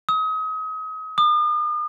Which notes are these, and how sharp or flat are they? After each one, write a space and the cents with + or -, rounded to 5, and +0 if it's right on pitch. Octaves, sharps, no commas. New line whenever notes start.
D#6 +35
D#6 -45